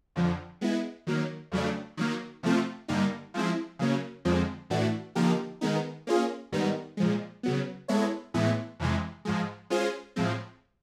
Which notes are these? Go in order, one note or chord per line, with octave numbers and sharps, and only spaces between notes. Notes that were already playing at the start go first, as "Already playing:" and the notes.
F2 D3 F3
G#3 B3 E4
D#3 F#3 A#3
F2 C#3 F#3 A3 D4
D#3 F#3 A#3
C3 F3 A3 C4 F4
G2 D3 G3 A#3 D#4
F3 G#3 C4 E4
C#3 F#3 A#3 C#4
F2 D3 F3 G#3 C4
A2 E3 A3 D4 F#4
D3 F3 A#3 D#4 G4
D#3 G#3 B3 D#4
A#3 C#4 F4 G#4
G#2 D#3 G3 B3 D#4
A#2 F3 G#3
C#3 F#3 B3
G#3 B3 E4 A4 C#5
A2 E3 G#3 B3 E4
F2 C3 E3 G#3
G#2 F3 G#3
G#3 C#4 F4 G#4 C5
A2 F3 G#3 C4